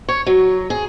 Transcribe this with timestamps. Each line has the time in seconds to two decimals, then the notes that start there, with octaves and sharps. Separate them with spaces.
0.09 C#5
0.26 F#3
0.70 G#4